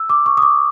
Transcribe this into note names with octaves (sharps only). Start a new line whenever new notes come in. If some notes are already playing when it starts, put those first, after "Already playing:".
Already playing: E6
D6
C#6
D#6
D6